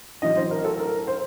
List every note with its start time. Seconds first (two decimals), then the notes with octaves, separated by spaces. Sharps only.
0.22 A1 A2 F#3 D#5
0.36 C5
0.51 A#4
0.65 A4
0.79 A#4
1.07 C5